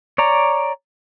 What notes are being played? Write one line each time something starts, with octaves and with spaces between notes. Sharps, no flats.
C#5 D5 A#5